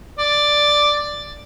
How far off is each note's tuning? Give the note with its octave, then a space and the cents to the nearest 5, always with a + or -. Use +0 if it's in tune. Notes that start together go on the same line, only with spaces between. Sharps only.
D5 +5